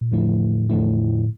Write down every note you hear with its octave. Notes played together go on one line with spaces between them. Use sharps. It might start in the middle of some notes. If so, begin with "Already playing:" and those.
A#2
E2 A2 D3 F3 A3 E4
E2 D3 F3 A3 E4